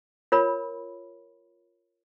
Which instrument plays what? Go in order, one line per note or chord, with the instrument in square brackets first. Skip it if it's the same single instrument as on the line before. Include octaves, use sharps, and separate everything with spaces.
[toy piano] F4 A#4 C#5 B5